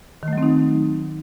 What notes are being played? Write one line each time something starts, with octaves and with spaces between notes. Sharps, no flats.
D#3 F#3 A3 C4 D#4